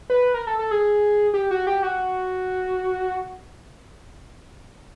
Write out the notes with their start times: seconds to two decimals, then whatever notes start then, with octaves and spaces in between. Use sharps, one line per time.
0.10 B4
0.34 A#4
0.47 A4
0.59 A4
0.71 G#4
1.34 G4
1.51 F#4
1.67 G4
1.83 F#4